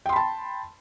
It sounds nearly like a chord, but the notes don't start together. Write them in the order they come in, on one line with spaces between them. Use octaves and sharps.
G5 C6 B5 A5